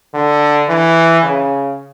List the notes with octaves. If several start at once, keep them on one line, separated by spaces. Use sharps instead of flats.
D3
E3
C#3